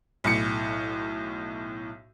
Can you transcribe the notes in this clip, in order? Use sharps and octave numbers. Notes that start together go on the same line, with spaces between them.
B1 A2 C#7